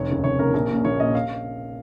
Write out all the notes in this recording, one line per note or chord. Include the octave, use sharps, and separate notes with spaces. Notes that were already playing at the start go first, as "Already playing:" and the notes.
Already playing: F1 C#5
D#2 C#3 A#3 C#4
F1 C#5
D#2 C#3 A#3 C#4 A#4
A#1 A#4
A#2 A#3 C#4
A#1 C#5
A#2 A#3 C#4 D#5
F5